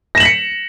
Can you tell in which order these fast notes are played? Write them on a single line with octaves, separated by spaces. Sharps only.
A#6 E7 F#7 B6 C#7